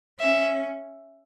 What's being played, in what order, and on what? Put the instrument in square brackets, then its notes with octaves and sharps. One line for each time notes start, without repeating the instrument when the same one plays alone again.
[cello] C#4 [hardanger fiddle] E5